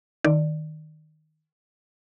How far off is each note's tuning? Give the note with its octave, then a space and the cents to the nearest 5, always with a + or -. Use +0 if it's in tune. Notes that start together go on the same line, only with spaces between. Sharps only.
D#3 -5 D5 +0